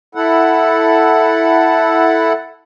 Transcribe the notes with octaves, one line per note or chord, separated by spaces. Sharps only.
E4 A4 F#5